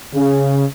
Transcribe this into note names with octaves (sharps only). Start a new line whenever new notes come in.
C#3